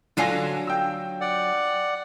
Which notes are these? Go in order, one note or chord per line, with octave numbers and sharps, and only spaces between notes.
D3 F#3 D4 F4 G#5 A#6
G5 E6
D5 F#5